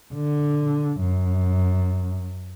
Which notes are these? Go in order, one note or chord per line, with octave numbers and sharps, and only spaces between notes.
D3
F#2